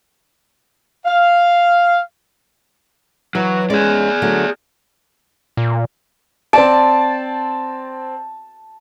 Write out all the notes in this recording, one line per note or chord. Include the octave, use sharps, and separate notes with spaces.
F5
E3 F#3
E2 G#3 C#4 G#4 D5
D3 F#3 A3
A#2
C4 D5 A5 D7